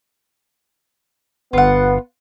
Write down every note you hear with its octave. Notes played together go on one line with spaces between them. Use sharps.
G1 B3 F4 F#5